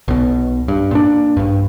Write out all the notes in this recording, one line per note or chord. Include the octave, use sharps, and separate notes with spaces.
B1 B2
G2
A#2 D4
A#1 G2